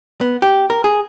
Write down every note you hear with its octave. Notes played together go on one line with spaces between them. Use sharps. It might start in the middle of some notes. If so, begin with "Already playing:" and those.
B3
G4
A#4
G#4